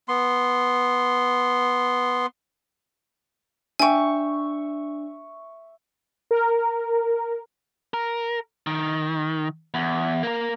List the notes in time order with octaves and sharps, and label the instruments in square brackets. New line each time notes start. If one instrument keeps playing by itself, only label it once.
[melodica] B3 C6
[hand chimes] D4 [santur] E5 C#6 [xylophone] G5 G#5
[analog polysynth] A#4
[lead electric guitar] A#4
D#3
E2
A#3 A#4